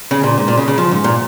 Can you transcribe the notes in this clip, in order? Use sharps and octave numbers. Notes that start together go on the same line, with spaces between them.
C#3
A#2
G#2
A#2
C#3
C#3
F3
G#2
A#2